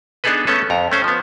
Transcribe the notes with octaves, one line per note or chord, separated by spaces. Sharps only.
B3 D4 D#4 G#4 A4 B4
A3 B3 C#4 A4
F2 A#5
A3 C#4 C5
F3 B3